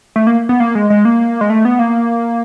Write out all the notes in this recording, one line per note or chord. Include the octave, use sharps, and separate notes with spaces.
A3
A#3
B3
A#3
G#3
G#3
A#3
G#3
A3
B3
A#3